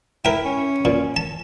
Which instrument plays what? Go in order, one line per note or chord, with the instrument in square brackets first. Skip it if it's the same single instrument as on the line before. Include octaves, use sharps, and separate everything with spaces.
[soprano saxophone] E4 [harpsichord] A#4 G5
[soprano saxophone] C#4
[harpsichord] A#2
A5